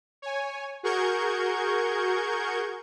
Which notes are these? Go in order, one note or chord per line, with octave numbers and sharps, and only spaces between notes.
C#5 G#5
F#4 G#4 A#4 C#6 G6 G#6